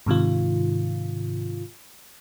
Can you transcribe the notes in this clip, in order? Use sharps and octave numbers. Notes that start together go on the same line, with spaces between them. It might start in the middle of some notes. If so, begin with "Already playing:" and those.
G#2 C3 D#3 F4